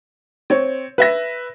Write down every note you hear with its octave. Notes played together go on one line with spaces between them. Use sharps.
C4 C#5
B4 E5 A#6